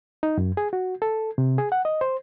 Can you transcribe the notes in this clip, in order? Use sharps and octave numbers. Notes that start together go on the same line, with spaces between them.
D#4
F#2
G#4
F#4
A4
C3
G#4
F#5
D#5
C5